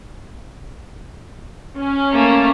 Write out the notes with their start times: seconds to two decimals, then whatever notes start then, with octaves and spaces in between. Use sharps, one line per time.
1.77 C#4
2.12 A3 A#3